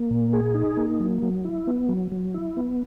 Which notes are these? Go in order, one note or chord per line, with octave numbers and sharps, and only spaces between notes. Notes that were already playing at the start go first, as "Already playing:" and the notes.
Already playing: A#3
A#2
G#4
D#4
A#3
F#3
F#3
E4
B3
F#3
F#3
E4
B3